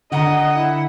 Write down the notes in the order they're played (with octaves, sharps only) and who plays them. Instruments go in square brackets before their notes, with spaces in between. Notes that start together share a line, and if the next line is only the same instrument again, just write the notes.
[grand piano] D3 A#5 [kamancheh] D#5 [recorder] F#5
[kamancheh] E4